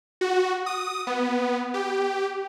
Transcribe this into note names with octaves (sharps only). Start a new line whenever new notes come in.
F#4
D#6
B3
G4